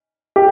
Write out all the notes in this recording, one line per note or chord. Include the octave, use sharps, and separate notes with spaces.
G4